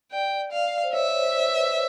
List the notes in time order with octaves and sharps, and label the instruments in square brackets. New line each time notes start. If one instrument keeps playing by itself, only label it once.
[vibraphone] D5 [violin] G5
[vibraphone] D5 [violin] F5
[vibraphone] C5
[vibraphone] C#5 [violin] E5
[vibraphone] C5
B4